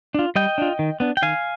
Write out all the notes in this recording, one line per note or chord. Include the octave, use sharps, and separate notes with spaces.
D4 F4
G3 D#5 G5
D4 F4
D#3
B3 D4
G5
D#3 F5 G#5